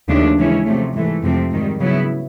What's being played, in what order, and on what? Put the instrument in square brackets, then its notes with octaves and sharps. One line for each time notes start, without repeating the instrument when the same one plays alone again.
[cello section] D#2 C#3 F3 A3 D4
C#3 E3 G#3 C#4 E4
C3 F3 A3
G#2 E3 A3
F2 C3 F3 A3 C4
G#2 D#3 G3
C#3 F#3 B3 E4